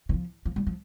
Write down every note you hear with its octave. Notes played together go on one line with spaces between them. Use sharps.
D#3
F3
F3
G3
F3